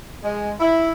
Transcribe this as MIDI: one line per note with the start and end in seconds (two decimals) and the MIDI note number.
0.22 0.52 56
0.60 0.92 64